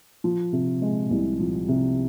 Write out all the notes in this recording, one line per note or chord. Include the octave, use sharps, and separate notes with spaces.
F3
C3
G#3
C2
F3
C3